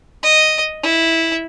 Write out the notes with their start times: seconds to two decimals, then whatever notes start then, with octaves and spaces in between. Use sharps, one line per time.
0.23 D#5
0.83 E4